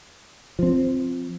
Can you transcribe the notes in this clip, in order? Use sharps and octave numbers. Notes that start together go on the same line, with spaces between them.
F3 C4